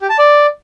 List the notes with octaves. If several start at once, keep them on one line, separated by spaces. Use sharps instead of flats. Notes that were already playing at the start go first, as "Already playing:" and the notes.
G4
A5
D5